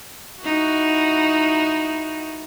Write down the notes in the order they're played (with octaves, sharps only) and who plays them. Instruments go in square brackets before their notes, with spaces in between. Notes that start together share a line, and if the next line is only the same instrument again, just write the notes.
[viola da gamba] D#4 E4 F#4